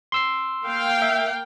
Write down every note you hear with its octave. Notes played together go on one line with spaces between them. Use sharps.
C6 E6 C7
A#3 F5 G5
E5